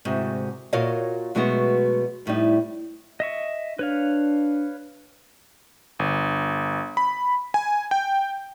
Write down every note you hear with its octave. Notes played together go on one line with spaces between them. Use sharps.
D2 G#2 C3 F#4
A#2 F#4 A#4 C#5 D#5 F5
B2 F#3 G#3 A3 B3 F#4
F2 A2 G3 D#4
D#5 E5 C#6
D4 B4 C#5 F5
G1
B5
G#5
G5